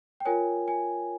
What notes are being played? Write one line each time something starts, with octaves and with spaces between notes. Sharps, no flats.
G5
F4 A#4 C#5 G#5
G#5